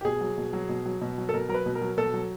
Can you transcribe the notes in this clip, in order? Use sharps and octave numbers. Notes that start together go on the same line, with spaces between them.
G4
B2 G#4
F#3
B2
F#3
B2
F#3
B2
F#3
A4
B2 A#4
F#3 A#4
B4
B2
A#4
F#3
B2 A4
F#3